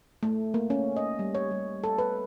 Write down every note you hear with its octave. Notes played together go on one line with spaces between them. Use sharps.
A3
A#3
C#4
D#5
G3
C#5
G3
A4
B4